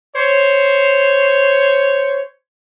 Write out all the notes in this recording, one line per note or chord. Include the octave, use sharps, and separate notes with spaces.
C5 C#5